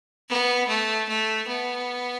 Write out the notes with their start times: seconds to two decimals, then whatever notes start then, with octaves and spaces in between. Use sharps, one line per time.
0.29 B3
0.68 A3
1.08 A3
1.47 B3